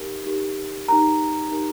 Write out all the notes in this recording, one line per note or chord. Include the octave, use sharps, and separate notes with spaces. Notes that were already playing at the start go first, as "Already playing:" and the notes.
Already playing: D#4 G4 A#4
D#4 G4 A#4
D#4 G4 A#4 A#5
D#4 G4 A#4